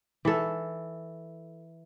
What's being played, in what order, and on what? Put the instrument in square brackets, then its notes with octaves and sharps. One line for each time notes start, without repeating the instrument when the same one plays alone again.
[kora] E3 A4